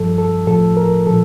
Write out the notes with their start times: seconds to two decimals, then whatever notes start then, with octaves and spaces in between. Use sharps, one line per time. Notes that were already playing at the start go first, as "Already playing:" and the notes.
Already playing: G2 F3 A4
0.18 A4
0.47 A2 F3 A4
0.77 A#4
1.07 A#2 F3 A4